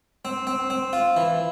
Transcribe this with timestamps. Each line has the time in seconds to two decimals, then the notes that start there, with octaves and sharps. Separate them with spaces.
0.25 C4
0.47 C4
0.70 C4
0.93 F4
1.17 E3